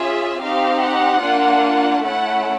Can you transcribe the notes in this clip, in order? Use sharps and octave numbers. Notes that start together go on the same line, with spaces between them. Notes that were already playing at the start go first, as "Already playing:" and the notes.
Already playing: C#4 F4 G#4 E5
C4 D#4 G4 F5
F#5
A#3 D4 F4
A3 C#4 E4 F#5